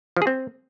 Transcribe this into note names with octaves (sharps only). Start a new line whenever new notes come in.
F3
G#4
C4